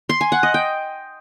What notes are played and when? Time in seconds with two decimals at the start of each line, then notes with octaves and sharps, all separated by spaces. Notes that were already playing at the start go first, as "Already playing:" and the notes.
0.09 C6
0.21 G#5
0.32 F#5
0.43 D#5
0.54 G5